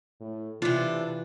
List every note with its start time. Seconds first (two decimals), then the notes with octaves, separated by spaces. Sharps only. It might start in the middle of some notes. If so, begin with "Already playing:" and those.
0.21 A2
0.62 C3 E3 D4 F4